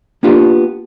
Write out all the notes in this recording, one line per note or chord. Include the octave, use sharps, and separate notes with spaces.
A#3 B3 D4 F4 G4